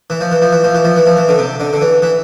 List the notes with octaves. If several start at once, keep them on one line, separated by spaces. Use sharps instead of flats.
E3
F3
E3
F3
E3
F3
E3
F3
E3
F3
E3
D3
C3
D3
D3
E3
E3